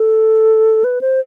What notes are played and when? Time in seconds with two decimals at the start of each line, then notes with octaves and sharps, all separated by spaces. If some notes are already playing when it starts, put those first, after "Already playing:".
Already playing: A4
0.84 B4
1.01 C5